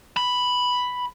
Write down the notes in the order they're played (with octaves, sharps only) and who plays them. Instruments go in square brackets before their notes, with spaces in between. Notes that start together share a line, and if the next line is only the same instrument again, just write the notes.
[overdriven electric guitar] B5